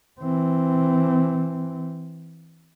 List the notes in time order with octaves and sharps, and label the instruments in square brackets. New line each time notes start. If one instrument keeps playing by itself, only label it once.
[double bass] E3 C4